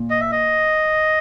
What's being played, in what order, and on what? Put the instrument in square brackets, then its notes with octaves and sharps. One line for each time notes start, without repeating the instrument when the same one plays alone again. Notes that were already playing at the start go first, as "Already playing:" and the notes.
Already playing: [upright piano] A#2
[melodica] D#5
E5
D#5